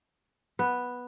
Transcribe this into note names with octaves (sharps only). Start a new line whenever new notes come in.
B3